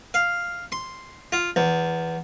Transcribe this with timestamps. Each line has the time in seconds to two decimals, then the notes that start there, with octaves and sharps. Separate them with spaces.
0.14 F5
0.72 C6
1.32 F4
1.56 E2